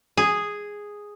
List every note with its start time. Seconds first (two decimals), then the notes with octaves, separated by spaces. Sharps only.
0.17 G#4